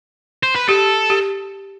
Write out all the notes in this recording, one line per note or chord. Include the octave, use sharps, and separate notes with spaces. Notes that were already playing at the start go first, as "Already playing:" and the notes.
C5
B4
G4 A4
G4